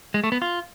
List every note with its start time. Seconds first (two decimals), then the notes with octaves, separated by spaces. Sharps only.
0.14 G#3
0.24 A3
0.32 B3
0.42 F4